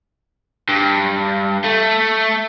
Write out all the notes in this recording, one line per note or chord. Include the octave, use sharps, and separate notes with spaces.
G2
A3